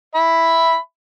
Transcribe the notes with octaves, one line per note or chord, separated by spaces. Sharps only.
E5 B5